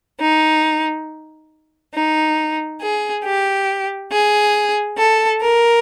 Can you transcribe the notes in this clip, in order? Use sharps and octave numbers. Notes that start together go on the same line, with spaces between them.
D#4
D#4
G#4
G4
G#4
A4
A#4